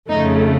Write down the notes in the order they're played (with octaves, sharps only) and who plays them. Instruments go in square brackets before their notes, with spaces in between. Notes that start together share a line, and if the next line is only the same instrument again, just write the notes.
[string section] F2 C#3 A3 D#4